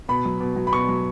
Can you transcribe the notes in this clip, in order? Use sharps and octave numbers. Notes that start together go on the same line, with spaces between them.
B2 B5
F#3
B2
F#3
B5
B2 C#6
F#3